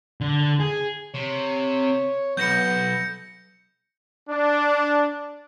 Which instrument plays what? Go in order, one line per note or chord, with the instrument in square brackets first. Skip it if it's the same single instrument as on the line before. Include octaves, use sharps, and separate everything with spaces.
[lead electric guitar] D3
G#4
[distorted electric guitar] C3 [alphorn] C#5
[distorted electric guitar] B1 [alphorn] B3 [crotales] G6 A#6 C#7
[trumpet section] D4